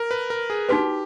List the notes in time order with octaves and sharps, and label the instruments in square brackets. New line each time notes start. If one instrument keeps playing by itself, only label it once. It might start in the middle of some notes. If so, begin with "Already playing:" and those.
Already playing: [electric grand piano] A#4
B4
A#4
G#4
[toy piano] D#4 F#4 B4 [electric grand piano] G4